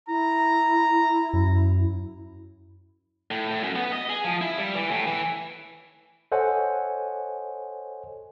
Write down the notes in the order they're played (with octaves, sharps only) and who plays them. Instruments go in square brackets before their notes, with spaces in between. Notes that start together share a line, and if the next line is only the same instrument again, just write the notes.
[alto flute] E4 [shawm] A#5
[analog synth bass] F#2
[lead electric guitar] A2
A2
F#2
B3
D#5
G#4
F3
E4
G3
E3
A2
E3
[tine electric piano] A4 C5 C#5 D#5 F#5 G#5